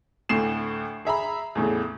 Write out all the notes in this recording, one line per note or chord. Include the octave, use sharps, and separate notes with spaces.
D2 A2 C7 E7
G#4 E5 A#5 B5
E2 A2 C#3